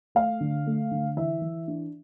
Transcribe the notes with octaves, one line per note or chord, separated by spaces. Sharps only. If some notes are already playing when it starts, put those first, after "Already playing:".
A3 F5
D3
A3
D3
E3 E5
E3
D4